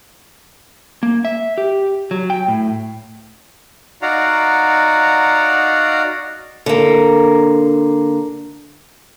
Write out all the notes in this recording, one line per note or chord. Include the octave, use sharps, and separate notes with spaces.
A#3
E5
G4
F#3
G5
A2
D#4 F#4 D5 F5 F#5 A#5
D3 A#3